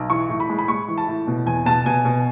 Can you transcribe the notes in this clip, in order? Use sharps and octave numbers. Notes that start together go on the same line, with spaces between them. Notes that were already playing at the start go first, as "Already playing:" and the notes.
Already playing: B1
E3 C#6
A2
B5
G#3
B5
G#3 C#6
E3
A5
A2
B2
E2 G#5
B2 A5
B2 G#5
B2